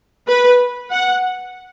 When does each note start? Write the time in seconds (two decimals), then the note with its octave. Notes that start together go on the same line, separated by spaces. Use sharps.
0.28 B4
0.91 F#5